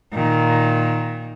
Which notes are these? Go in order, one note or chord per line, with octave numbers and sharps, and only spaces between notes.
A#2 D#3